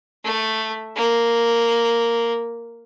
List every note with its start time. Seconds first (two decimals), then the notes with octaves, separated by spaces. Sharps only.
0.24 A3
0.96 A#3